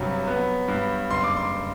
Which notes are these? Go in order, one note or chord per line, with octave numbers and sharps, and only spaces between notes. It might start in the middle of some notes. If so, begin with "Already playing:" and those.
Already playing: G2 C3 F#3
B3
G2
F#1 C6
D6
C6